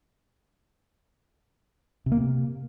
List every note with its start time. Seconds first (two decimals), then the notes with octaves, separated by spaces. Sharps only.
2.06 C3
2.12 A#3
2.17 C3